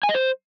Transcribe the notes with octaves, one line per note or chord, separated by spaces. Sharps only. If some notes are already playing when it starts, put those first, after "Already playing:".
G#5
D#5
C5